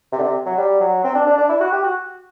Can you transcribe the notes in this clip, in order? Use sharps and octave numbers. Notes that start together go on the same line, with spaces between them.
C3
D3
C3
F#3
G3
F#3
C4
D4
D4
D4
E4
F#4
G4
F#4